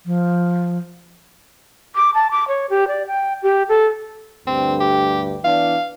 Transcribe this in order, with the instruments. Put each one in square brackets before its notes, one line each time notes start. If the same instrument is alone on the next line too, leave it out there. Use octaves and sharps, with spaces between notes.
[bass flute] F3
[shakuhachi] D6
A5
D6
C#5
G4
D5
G5
G4
A4
[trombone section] D2 G2 [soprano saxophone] C4
[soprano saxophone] G4
[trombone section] E3 B3 D4 [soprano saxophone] F5